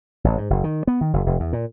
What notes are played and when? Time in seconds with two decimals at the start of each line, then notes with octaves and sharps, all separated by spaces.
0.24 A1
0.37 G#2
0.50 F#1
0.64 D#3
0.87 B3
1.01 D#3
1.13 F#1
1.26 F1
1.40 E2
1.53 A#2